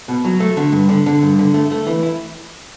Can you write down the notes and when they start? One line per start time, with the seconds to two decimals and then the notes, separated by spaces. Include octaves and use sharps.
0.08 B2
0.25 F#3
0.40 A3
0.57 D3
0.72 G2
0.89 D3
1.06 D3
1.23 G2
1.39 D3
1.54 A3
1.72 A3
1.87 E3
2.03 E4